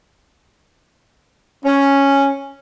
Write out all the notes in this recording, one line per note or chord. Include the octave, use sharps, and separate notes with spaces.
C#4